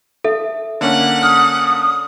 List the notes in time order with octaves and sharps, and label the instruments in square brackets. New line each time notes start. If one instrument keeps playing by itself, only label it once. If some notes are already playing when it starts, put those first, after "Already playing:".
[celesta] A4 E5
[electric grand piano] D3 A#3 C#4 [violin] F#5
[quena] D#6 [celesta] F6